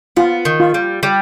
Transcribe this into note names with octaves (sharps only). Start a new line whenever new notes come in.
B3 F4
D#3
F4
G3
G3